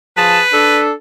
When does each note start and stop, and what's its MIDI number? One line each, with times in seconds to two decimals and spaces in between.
0.17 0.40 53
0.17 0.40 68
0.17 0.81 71
0.17 0.40 81
0.53 0.92 62
0.53 0.92 69